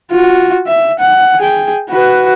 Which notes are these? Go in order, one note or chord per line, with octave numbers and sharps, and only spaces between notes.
F4 F#4
E5
F#5
G#4 G5
F#4 B4